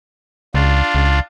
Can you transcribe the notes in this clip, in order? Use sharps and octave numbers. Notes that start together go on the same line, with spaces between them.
C#2 D4 F4
C#2